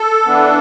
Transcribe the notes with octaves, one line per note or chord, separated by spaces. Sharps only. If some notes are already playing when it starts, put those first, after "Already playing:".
Already playing: A4
E3 B3 D4